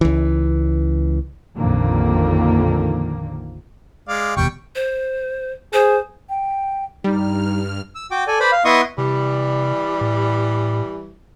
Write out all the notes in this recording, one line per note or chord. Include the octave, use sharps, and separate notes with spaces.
C#2 E3
A#1 F2 A#2 D3 D#3 A#3
G#3 D5 F5
F1 D#2 B2 G3 G5 C#6
C5
G#4 C5
G5
G2 G3 D#4 F6
E6
F#4 G5 D6
A4 D5 G#5
B4 C5 D5 B5
F5
B3 E4 D#5 C6 C#6 D#6
C3 E3 G3
A2